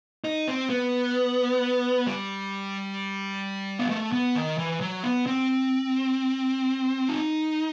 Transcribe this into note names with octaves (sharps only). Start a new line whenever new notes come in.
D#4
C4
B3
G3
B3
A3
B3
D#3
E3
F#3
B3
C4
D#4